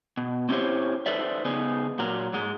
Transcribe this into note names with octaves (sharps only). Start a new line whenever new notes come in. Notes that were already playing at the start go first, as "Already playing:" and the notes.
B2
C4 C#4 E4 G4 C5 C#5
D#4 A4 B4 C5 D5 E5
C#3 B3 D#4 G#4
A#2 F#3 A#4
G#2 G#3